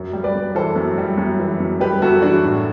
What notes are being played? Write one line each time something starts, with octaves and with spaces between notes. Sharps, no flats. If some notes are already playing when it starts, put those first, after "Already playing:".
Already playing: F#2
G3
B4 D5
F#2
E3 A4 C5
F#2
G3
F#2
E3
F#2
G3 G4 B4
F#2 F#4 A4
E3 D4 F#4
A2